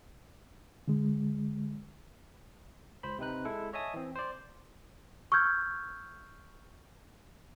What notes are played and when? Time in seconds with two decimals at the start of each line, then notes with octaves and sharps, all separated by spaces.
0.88 D3 G#3
3.03 C#2 C5 B5
3.19 C3 C4 D#4 B4 F#6
3.45 G#3 E4 A4
3.73 C#5 D#5 E5 G#5 A5 D#6
3.94 E3 C4
4.16 C5 D5
5.32 C#6 E6 F6 G6 G#6